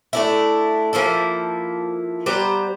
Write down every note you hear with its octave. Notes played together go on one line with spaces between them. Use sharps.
A3 D4 E4
F3 A#3 E4 A4
G3 B3 C5 A#5